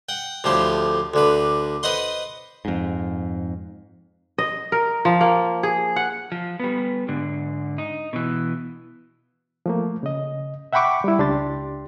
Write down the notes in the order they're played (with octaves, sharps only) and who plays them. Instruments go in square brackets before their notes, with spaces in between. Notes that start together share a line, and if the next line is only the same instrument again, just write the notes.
[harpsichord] F#5 G5
D2 A2 F3 G4 C5
D2 D3 B4
B4 C5 D#5 F#5 C6
[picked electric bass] F2 G#2
[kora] D#5
A#4
F3
A#3
G#4
F#5
[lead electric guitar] F3
G3 B3
G#2 D3
D#4
B2 E3
[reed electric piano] F3 A3 A#3
C#3 D#5
E5 F#5 G5 B5 C#6 D6
G3 E4
C#2 D4 G4 C6 A6